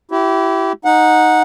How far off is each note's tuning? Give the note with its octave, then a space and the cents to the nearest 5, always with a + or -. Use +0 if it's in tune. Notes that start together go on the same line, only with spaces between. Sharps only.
E4 +10 G4 -30
D#4 +0 F#5 -15